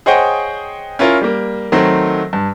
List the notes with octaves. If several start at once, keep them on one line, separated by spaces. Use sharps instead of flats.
G#4 C5 C#5 D#5 F#5 G5
C#4 E4 F4 A#4
G3 A#3
D#3 F#3 A3 C4
G2